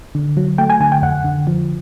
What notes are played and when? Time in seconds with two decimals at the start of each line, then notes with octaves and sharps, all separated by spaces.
0.15 D3
0.37 F#3
0.58 A3 G5
0.70 G#5
0.80 D3 G#5
0.92 G5
1.02 F2 F#5
1.24 D3
1.47 F3